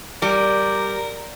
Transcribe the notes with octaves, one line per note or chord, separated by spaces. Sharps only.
G3 A#4 D5